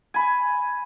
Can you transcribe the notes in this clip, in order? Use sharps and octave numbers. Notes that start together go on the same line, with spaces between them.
G#5 B5